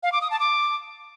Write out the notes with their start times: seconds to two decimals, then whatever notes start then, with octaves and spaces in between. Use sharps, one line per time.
0.03 F5
0.12 D6
0.21 D#6
0.31 A5
0.40 D6